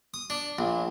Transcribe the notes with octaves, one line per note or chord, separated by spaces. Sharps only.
D#6
D4
A#1